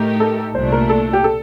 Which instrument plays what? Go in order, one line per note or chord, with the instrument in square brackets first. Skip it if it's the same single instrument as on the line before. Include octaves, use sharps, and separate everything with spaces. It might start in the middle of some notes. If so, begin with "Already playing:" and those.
Already playing: [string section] A2 A3 D#4 G4 A#4
[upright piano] A4
[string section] C2 A#2 A3 D4 [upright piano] C5
[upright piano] A#4
A4
G4
A4